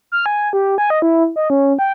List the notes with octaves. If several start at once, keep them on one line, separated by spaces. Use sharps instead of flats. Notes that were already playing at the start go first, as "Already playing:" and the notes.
F6
G#5
G4
G#5
D#5
E4
D#5
C#4
G5